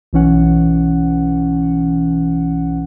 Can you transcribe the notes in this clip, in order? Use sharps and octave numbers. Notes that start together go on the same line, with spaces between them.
B1 E3 C#4 F#5